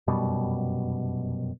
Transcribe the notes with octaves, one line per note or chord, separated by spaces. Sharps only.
F1 F#2 B2 G3